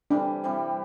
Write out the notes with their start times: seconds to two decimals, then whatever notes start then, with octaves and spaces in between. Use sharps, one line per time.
0.10 C3 E3 G3 D4
0.44 C3 E3 G3